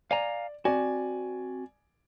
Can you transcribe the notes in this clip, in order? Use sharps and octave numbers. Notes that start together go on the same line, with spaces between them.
D5 F5 G#5 A#5
C4 F#4 D5 G#5